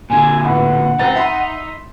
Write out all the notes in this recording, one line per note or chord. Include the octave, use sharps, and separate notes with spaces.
A#2 D3 G#5
A2 B3 F#5
C#2 C4 D#4 A6
E5 B5 C6